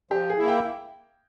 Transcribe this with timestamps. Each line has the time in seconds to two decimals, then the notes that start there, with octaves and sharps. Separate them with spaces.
0.11 F3 G4
0.30 G#4
0.38 A#3 E4
0.48 G5